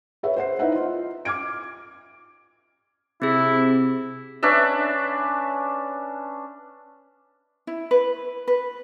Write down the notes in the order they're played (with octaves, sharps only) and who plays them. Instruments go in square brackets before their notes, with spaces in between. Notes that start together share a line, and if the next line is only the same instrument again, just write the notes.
[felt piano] G#4 B4 C#5 E5
C5 F#5 C7
D#4 E4 B4 E5 F#5
F4
D6 F6 G#6 D7
[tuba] C3 [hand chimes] C4 G#4 [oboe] E4
[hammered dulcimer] C#4 D4 B4 E5
[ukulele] E4
B4
B4